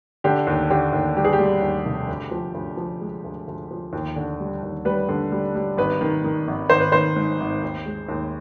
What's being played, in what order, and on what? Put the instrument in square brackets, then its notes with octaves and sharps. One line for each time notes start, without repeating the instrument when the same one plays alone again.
[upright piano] D3 G4
D#2
D3 G4
D#2
G3 G4
G#4
G4
G3
D#2
F1
D2
F3
D2
F3
G#3
D2
D2
F3
D#2
D3
G3
D#2
G3 B4
D3
G3
G3
G#1 B4
D#3
D#3
G#1
G#1 C5
B4
D#3 C5
G#2
G#1
D#2
G#3
D#2